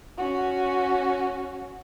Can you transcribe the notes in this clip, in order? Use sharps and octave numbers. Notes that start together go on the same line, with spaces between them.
C#4 F#4